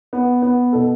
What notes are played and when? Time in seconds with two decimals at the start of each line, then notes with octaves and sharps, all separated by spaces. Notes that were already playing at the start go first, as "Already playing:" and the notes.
0.13 B3
0.42 B3
0.73 B2 A4